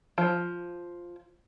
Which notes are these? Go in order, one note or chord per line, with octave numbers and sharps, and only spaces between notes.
F3